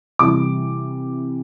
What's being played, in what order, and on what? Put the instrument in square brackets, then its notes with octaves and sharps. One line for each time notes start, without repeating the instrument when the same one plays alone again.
[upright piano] C3 E3 G3 D6